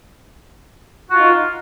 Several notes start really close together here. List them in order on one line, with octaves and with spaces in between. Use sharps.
F#4 F4 D#4